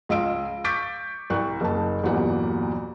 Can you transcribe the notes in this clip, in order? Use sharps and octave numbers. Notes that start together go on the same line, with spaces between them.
C#2 F4 D#5 E6 D7
C#6 D6 G6 A6 B6 D7
C2 C#6 F#6
F#1 A5
G1 E2 A#2 F#3 G4 F#5